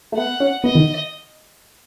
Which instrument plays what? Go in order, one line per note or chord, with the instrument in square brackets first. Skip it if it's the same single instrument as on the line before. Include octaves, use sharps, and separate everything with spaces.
[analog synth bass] A3
[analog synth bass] B3 [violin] F#5
[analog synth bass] C#4
[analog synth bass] B3 [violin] D#5
[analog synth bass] D#3